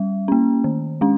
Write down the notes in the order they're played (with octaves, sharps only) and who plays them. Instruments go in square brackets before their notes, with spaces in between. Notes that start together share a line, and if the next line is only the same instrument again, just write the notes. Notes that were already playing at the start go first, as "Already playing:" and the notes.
Already playing: [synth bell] G3
A#3 C#4
D#3
G#3 C#4